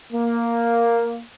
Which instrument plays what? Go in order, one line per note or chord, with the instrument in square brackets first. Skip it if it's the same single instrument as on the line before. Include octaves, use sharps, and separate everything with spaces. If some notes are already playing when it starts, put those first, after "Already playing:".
[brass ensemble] A#3